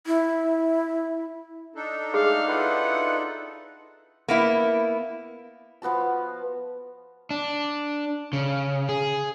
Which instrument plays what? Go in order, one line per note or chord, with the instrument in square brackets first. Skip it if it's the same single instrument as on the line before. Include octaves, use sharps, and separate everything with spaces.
[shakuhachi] E4
[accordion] D4 D#4 A4
[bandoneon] G#3 A3 [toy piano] G#4 [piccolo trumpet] F5
[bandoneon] E4 F4 B4 [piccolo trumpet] F#5
[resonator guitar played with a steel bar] A#3 B3 E4
[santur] F3 B3 F#4 A5
[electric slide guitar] D4
C#3
G#4